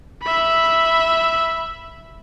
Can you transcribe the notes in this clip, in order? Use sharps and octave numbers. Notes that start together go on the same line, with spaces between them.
E5 B5